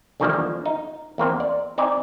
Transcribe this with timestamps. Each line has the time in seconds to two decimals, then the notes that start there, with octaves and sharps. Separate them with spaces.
0.20 E2 D3 D#3 F3 G3 A#3
0.66 D#4
1.18 E2 A#3 C4 C5
1.40 D5
1.78 C4 D#4 D5 G#5